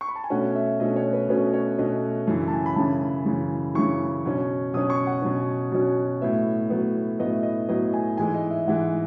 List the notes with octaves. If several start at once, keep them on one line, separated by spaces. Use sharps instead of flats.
C#6
B5
A5
G#5
B2 A3 C#4 F#5
E5
B2 A3 C#4 D#5
C#5
B4
B2 A3 C#4 B4
C#5
B2 A3 C#4 D#5
F#2 C#3 E3
A5
G#5
B5
F#2 C#3 E3 A5
F#2 C#3 E3
F#2 C#3 E3 C#6
B2 F#3 C#4
B2 F#3 C#4 D#6
C#6
F#5
B2 F#3 C#4
B2 F#3 C#4
A2 F#3 B3 E5
A2 F#3 B3
A2 F#3 B3 D#5
E5
D#5
A2 F#3 B3 D#5
G#5
G#2 E3 G#3 G#5
D#5
E5
G#2 E3 G#3 F#5